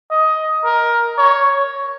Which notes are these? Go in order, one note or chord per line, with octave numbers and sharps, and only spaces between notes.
D#5
A#4
C#5